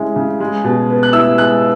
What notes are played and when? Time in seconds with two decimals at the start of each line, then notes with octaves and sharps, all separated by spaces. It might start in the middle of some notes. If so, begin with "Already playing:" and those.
Already playing: C#3 G#3 C#4 E4
0.16 C#3
0.40 G#3
0.64 B2
0.90 B3
1.03 F#6
1.13 E4 E6
1.38 G#3 F#6